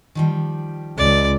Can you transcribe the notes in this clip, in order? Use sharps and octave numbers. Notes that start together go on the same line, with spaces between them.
D#3 F3 G3
C#2 D5